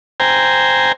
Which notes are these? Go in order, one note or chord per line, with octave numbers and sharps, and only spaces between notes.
C5 G5 G#5 A#5